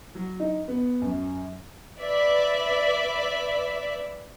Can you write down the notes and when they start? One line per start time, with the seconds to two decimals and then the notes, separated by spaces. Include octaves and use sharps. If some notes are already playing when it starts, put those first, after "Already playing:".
0.15 F#3
0.40 D#4
0.68 B3
1.02 F#2
1.98 B4 D5 E5